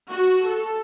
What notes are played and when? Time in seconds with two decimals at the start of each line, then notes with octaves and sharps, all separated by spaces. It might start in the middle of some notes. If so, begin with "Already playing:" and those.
0.10 F#4
0.46 A4